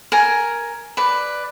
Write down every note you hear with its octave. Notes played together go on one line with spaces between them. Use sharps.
A#4 G#5
B4 D5